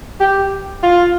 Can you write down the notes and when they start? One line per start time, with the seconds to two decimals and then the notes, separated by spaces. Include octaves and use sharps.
0.20 G4
0.83 F4